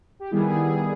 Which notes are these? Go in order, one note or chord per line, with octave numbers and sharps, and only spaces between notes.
G4
D#3 G3 B3 E4 G#4
G#4
G#4